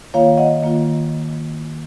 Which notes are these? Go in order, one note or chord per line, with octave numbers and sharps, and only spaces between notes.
D#3 A#3 F4 C#5 F5
D#5 F#5
D#3 A#3 F4